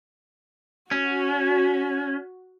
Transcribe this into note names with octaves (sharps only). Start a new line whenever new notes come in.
C#4 F#4